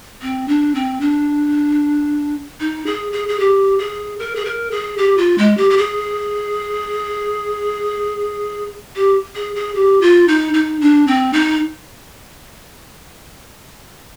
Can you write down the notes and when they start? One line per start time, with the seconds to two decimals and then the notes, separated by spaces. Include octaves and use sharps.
0.22 C4
0.48 D4
0.75 C4
1.01 D4
2.60 D#4
2.86 G#4
3.12 G#4
3.29 G#4
3.39 G4
3.79 G#4
4.19 A#4
4.36 G#4
4.45 A#4
4.71 G#4
4.98 G4
5.18 F4
5.38 G#3
5.57 G4
5.70 G4
5.78 G#4
8.96 G4
9.35 G#4
9.56 G#4
9.75 G4
10.01 F4
10.28 D#4
10.54 D#4
10.81 D4
11.07 C4
11.33 D#4